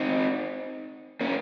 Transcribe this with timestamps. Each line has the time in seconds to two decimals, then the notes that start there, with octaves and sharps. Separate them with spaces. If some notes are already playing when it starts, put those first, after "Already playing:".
Already playing: C4 D#4
1.21 A#3 C#4